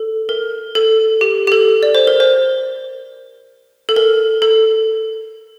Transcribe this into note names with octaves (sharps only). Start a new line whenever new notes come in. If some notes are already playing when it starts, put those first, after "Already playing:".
Already playing: A4
A#4
A4
G4
G4
A4
D5
C5
A#4
C5
A4
A#4
A4